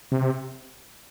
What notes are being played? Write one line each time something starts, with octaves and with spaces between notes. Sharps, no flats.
C3